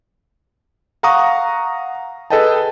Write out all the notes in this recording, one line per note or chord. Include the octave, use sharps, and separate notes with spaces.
F5 F#5 A#5 C#6 D#6
G#4 A4 B4 D#5 G5 A5